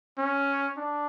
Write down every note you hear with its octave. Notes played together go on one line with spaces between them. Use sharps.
C#4
D4